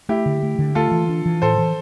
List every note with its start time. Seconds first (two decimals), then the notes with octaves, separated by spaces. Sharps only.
0.09 A3 E4 G4
0.26 D3
0.43 A3
0.59 D3
0.75 A3 F4 A4
0.91 E3
1.09 D4
1.25 E3
1.42 A2 A4 C5
1.58 E3